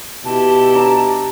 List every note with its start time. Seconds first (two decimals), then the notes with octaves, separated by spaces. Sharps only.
0.25 B2 E4 G4 A5
0.75 D4 A#5